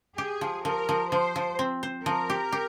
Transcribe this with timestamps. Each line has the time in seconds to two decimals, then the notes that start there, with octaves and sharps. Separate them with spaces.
0.18 G4 G#4
0.41 F3
0.65 F3 A#4
0.89 F3
1.12 F3 C5
1.36 F3
1.59 C4
1.83 C5
2.06 F3 A#4
2.30 G4
2.52 G4